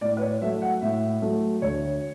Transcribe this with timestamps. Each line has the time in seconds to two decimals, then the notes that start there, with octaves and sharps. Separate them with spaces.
0.01 A2 D5
0.17 B4
0.21 C#5
0.41 F#3 A3 E5
0.62 F#5
0.81 A2 E5
1.22 F#3 A3
1.62 D2 C#5